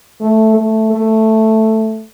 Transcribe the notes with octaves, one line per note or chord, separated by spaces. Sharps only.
A3
A3
A3